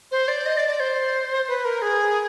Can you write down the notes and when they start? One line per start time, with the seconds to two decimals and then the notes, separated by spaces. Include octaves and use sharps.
0.12 C5
0.28 D5
0.46 D#5
0.57 D5
0.68 D5
0.80 C5
1.48 B4
1.65 A#4
1.82 G#4